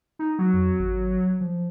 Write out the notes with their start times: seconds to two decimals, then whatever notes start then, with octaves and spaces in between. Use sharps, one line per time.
0.19 D#4
0.39 F#3
0.53 F2
0.79 G#1
1.41 F3